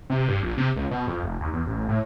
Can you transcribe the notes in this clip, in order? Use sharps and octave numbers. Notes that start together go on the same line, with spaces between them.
C3
G2
A#1
C3
C#2
B2
F2
F1
D#2
E2
A1
A2